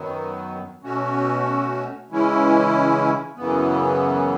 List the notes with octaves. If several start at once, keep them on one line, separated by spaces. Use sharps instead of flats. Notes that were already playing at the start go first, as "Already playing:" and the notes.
Already playing: F#2 D#3 F#3 B3
B2 A3 C#4 F#4
C#3 E3 G#3 C#4 E4
F#2 C#3 E3 B3